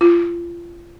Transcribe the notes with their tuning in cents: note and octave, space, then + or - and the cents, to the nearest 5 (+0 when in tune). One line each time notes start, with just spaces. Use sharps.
F4 -30